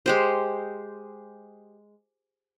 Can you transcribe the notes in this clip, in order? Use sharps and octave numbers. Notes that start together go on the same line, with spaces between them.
G#3 G4 C5